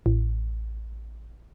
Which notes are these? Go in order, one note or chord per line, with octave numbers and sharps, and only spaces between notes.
A1